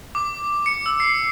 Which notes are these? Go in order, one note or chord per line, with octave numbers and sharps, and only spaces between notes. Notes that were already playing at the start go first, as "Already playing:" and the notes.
D6
C#7
E6
C7